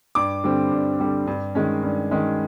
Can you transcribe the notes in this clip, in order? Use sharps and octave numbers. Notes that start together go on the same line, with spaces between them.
G2 D6
D3 G3 C4
G2
D3 G3 C4
G2
D#3 G#3 C#4
G2
D#3 G#3 C#4